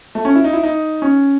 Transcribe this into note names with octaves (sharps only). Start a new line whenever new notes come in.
A3
C#4
E4
D#4
E4
D#4
C#4